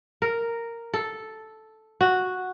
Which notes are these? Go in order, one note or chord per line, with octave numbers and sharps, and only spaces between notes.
A#4
A4
F#4